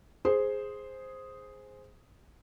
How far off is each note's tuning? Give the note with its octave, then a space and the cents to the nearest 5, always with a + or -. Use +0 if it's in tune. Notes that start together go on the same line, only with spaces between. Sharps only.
G#4 +0 C5 +0